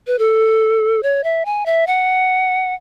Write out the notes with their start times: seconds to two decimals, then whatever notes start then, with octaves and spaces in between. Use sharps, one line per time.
0.07 B4
0.19 A4
1.03 C#5
1.24 E5
1.45 G#5
1.66 E5
1.87 F#5